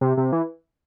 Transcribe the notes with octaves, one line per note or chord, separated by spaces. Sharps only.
C3
C3
E3